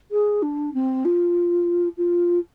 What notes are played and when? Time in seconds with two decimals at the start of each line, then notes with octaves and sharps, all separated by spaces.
0.11 G#4
0.42 D4
0.74 C4
1.05 F4
1.97 F4